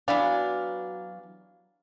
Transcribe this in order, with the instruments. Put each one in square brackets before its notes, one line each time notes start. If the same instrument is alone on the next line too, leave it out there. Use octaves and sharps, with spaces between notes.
[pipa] E3 B3 D4 [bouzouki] F#3 F5